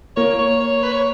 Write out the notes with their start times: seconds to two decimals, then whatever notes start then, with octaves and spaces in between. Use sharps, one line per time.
0.16 A#3 C#5
0.39 C#5
0.60 C#5
0.83 B4
0.92 C#5